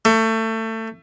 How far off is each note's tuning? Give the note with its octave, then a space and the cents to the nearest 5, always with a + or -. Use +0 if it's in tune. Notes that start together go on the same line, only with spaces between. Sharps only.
A3 +25